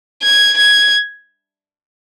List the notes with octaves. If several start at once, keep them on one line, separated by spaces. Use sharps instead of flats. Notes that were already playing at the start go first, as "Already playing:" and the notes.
G#6
G#6